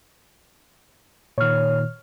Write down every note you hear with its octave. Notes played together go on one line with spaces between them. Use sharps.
A#2 D#3 C#5 F6